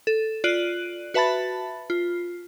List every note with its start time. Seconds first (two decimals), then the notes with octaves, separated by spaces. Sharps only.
0.07 A4
0.44 F4 D5 F#6 D7 D#7 F#7
1.14 F#4 B4 E5 A5 B5 A6
1.90 F4